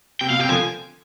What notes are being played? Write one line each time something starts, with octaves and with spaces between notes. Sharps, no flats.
C3 G5
B2 F5
C3 G5
D3 F3 G#5